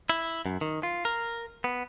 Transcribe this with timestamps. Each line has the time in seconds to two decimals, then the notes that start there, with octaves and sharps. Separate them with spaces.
0.10 E4
0.46 F#2
0.61 D#3
0.83 F4
1.05 A#4
1.64 B3